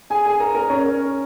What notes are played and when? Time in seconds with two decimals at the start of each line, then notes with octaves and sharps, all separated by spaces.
0.10 G#4 G#5
0.25 G#4 G#5
0.40 A#4 A#5
0.55 A#4 A#5
0.69 C#4 C#5
0.84 A#4